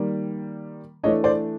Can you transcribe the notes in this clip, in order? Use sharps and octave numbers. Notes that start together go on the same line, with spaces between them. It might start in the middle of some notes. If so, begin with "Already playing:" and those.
Already playing: D#3 G3 A#3
E3 A3 D4 C#5 D#5
C5 D5